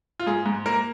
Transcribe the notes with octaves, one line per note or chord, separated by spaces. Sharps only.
F4
G#2 G#4
G#2
A#3 A#4